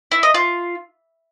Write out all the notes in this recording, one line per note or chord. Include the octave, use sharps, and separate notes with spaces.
E4
D#5
F4